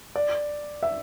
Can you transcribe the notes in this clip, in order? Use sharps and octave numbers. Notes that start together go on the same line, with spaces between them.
D5
E5